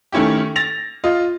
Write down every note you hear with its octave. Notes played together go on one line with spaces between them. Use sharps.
D#3 A3 C#4 E4 G4
A6 A#6 F7
F4 D#5